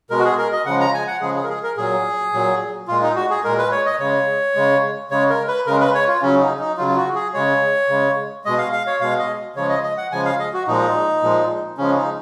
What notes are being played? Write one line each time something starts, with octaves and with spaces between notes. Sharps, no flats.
B2 G#3 A#4
F#4
G#4
A#4
D#5
C#3 F3 G#3 F#5
A#5
G#5
F#5
C#3 F3 G#3 G#4
G#4
A#4
G#4
A#4
A#2 F#3 G#4
A#2 F#3
A#2 G#3 F4
D#4
F#4
G#4
A#2 G#3 A#4
B4
C#5
D#5
C#3 G#3 C#5
C#3 G#3
C#3 G#3 C#5
A#4
B4
C#3 G#3 A#4
B4
C#5
F4
C#3 F#3 C#4
D#4
D#4
C#3 F#3 F4
F4
F#4
G#4
C#3 G#3 C#5
C#3 G#3
B2 G#3 D#5
F5
F5
C#5
B2 G#3 F5
D#5
C#3 F3 G#3 C#5
D#5
D#5
F#5
C#3 F3 G#3 G#5
F5
D#5
F#4
A#2 F3 G#3 D#4
A#2 F3 G#3
C#3 F3 G#3 C#4
D#4